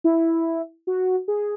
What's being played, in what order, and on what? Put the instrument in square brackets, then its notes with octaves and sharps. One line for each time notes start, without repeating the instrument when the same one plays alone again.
[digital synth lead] E4
F#4
G#4